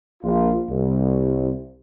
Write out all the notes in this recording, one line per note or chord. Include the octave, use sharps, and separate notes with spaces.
A#1 F4
C2